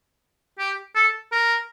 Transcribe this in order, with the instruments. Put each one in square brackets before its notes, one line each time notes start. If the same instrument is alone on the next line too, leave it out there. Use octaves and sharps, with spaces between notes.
[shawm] G4
A4
A#4